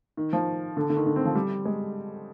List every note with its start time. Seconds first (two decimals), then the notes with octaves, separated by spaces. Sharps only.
0.17 D#3
0.33 F3
0.77 D3
0.90 D3
0.97 D#3
1.06 D3
1.16 C4
1.25 F3
1.35 G3
1.65 G#3